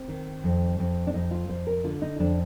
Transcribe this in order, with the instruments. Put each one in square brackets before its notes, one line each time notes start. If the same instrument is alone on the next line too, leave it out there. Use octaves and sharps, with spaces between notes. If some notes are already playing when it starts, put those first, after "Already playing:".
Already playing: [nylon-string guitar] C4
D#3
F2
F2
D4
F2 D#4
F4
F2 C5
A#4
D3 F4
D#4
F2 D4